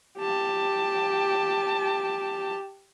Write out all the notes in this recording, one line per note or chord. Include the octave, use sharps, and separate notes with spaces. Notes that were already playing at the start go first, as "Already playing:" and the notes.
G4 A5